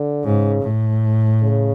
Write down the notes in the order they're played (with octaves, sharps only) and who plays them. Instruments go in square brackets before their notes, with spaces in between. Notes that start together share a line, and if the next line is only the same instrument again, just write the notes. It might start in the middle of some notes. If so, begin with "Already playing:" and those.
Already playing: [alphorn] D3
[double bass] G#2 [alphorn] C#3
[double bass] A2
[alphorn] C#3